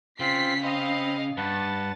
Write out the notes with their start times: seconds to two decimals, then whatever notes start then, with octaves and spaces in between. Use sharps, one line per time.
0.20 C#3 C4 F4 B6 C7
0.64 C4 D#5 F5 B5 C6
1.37 G2 B4 F#5 A5 A6